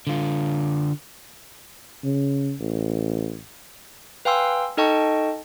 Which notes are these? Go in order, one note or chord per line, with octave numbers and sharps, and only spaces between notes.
D3 F4
C#3
A1
B4 F5 G5 G#5 C6 E6
D#4 A4 D#5 G5 A5 C#6